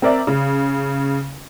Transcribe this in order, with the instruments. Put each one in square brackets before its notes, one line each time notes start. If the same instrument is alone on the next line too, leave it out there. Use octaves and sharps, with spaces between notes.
[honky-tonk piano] C4 A#4 D5 E5
C#3